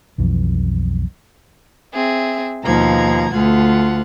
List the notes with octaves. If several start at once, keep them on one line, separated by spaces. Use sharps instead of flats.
B1 F2 E3
C4 G#4 E5
D#2 B2 F3 D#4 A#5 G#6
D2 A3 F4 F#5